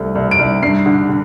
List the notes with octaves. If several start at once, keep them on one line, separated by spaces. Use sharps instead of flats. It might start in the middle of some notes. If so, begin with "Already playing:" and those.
Already playing: C2 A3
C2
D7
C2
G2 C7
D3
D3